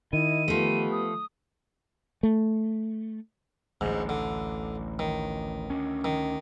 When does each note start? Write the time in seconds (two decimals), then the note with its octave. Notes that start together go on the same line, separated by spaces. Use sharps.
0.13 D#3 E4 D#5 D#7
0.48 F3 A3 B3 G4
0.92 D#6
2.23 A3
3.81 A1 D2 G#2
4.09 D3
4.99 D#3
5.70 D2 C#4
6.04 D#3